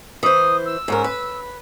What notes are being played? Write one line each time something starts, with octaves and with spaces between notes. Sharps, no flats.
E3 C5 D#6
E6
G#2 C#4 A#4
B4